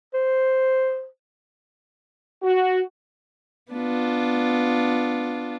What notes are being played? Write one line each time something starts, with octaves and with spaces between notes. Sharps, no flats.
C5
F#4
B3 D4 F4